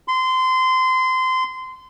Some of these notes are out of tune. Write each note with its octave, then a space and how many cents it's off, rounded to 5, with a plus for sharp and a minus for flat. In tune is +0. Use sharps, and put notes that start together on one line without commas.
C6 -25